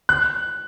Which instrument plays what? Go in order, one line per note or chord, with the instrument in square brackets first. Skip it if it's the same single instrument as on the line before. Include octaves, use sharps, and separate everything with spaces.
[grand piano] F#6